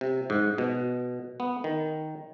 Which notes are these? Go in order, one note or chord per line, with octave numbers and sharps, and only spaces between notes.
C3
G#2
B2
B3
D#3